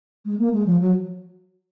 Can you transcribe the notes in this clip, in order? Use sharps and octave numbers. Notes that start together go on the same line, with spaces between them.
G#3
A#3
G#3
F3
F#3